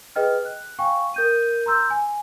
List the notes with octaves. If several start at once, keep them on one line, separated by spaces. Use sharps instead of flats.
G#4 B4 D#5 G5 F6
F#6
F5 G5 G#5 C#6
A#4 G6 D#7
A#5 C6 E6 G6
G#5